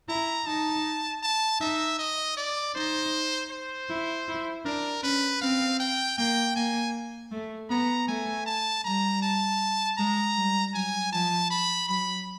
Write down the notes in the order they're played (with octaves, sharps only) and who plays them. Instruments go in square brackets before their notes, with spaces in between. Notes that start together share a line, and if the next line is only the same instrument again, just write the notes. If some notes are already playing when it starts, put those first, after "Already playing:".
[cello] E4 [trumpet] A#5
[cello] D#4 [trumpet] A5
[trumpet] A5
[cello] D#4 [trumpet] E5
[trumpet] D#5
D5
[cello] D#4 [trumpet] C5
[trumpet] C5
[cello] E4
E4
[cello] D4 [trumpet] A#4
[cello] C#4 [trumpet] B4
[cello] C4 [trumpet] F5
[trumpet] G5
[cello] A#3 [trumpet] G5
[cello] A#3 [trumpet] G#5
[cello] A3
[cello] B3 [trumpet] A#5
[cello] A3 [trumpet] G#5
[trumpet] A5
[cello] G3 [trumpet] A#5
[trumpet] A5
[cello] G#3 [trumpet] A#5
[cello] G3
[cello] F#3 [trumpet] G#5
[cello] F3 [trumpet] A5
[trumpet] B5
[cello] F#3 [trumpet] B5